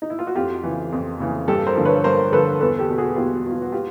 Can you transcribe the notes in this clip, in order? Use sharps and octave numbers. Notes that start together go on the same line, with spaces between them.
D#4
E4
F4
F#4
F2 F4 G4
C#3 E3
F2
C#3 E3
G2 G4 A4
A#4 C5
D3 F3
B4 C#5
G2 A#4 C5
D3 F3 A4 B4
E2 A4 B4
G4 A4
B2
F#4 G#4
E2 F4 G4
B2
F4
F#4
F4 G4